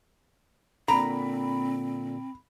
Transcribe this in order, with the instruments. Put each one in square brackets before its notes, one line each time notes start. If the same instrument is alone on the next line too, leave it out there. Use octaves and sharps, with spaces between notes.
[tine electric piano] A#2 D3 [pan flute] C4 [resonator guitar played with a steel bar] A#5 [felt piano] B5